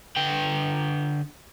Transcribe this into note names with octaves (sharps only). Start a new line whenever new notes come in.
D3 B4 G5